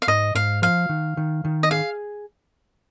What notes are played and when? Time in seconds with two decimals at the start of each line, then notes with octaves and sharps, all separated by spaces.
0.02 F5
0.07 G#2 D#5
0.35 G#2 F5
0.62 F3 F5
0.89 D#3
1.17 D#3
1.45 D#3
1.63 D#5
1.71 G#4 F5